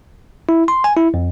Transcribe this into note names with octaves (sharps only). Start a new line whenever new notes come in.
E4
C6
G#5
E4
F2